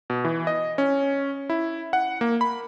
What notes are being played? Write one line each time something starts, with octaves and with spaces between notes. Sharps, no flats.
B2
E3
D#5
C#4
E4
F#5
A#3
B5